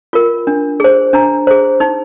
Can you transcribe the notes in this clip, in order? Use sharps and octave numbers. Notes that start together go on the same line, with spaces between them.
F4 A#4
D4
G#4 C5
D4 A#5
G#4 C5
D#4